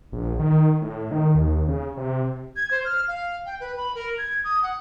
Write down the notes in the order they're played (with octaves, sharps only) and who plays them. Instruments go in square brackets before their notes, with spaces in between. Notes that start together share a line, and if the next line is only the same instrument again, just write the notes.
[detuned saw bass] A#1
D#3
A2
D#3
D#2
C#3
C3
[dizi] G#6
C5
F6
F5
G5
B4
B5
A#4
G#6
D#6
F#5